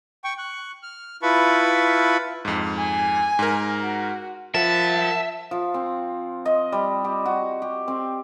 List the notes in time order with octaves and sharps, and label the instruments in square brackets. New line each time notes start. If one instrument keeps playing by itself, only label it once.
[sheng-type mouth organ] G5 C#6
C#6 F#6
F6
E4 F4 B4 A5 B5 C#6
[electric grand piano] F2 G#2
[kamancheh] G#5
[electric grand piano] G#2 A#4
[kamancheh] F#4
[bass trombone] F3 [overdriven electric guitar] A#4 F#5 [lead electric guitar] E5 [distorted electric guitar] A5
[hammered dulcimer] F3
C4
D#5
G3
G4
F#4
G4
C4